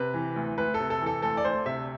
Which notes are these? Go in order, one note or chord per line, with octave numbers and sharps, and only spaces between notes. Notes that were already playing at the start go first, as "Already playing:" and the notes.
Already playing: C3 B4
E3
D2
D2 B4
A4
C3
A4
E3
A4
D2 A4
D5
D2 C5
C3 E5